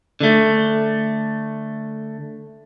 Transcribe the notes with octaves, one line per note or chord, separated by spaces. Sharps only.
D3 A3